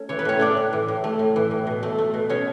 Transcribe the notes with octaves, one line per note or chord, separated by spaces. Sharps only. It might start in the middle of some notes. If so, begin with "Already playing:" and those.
Already playing: A3 C#4
E3 C#5
B4
A2 C#4 C#5
A3 D4 D5
A2
E3
A2
A3
A2
E3
A2
B2
A3
A3
B2
B2 C#4 C#5